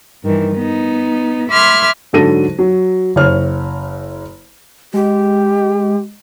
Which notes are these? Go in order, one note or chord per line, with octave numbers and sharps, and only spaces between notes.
G2 D#3 E3
B3 D#4
E5 B5 C6 D6 F6 G#6
G#2 D3 F#3 A4 A#6 D#7
F#3
F#1 C#5 F6
G#3 G4